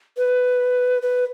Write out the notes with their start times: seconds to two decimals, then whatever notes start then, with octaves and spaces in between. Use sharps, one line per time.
0.18 B4
1.02 B4